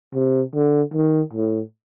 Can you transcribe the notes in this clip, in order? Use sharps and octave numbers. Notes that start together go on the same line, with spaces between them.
C3
D3
D#3
A2